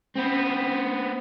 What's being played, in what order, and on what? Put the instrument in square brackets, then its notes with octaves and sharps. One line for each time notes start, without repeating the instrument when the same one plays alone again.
[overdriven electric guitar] B3 C4